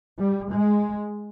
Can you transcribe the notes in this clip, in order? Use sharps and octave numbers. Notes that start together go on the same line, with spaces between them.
G3
G#3